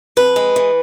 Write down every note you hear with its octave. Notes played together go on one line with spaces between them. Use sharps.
F2 B4
G#3
E3